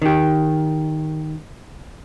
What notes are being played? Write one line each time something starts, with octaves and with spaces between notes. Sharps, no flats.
D#3 G4